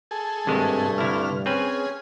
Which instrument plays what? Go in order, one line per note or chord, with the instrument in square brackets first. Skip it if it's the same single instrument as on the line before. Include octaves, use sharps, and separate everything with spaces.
[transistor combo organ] G#4 A4
[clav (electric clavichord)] G#1 C3 G#3 [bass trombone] G2 [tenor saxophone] A3
[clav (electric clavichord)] C2 E4 [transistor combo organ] D3 F6
[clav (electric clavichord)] C4 B4 [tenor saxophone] C#4 [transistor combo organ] G#4